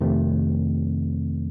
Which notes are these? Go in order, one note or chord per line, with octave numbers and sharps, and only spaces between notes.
F2 C3 D#3 A3 C4